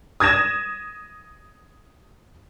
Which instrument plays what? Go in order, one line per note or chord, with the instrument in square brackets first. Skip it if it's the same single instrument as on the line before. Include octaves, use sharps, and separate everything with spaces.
[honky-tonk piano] D#6 G#6 A#6 E7